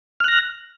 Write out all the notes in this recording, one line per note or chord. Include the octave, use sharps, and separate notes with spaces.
F6 F#6 A#6